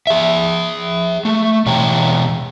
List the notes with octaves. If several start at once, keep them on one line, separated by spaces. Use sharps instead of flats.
G#4 E5
A3
B2 E3 C#5 G5 A#5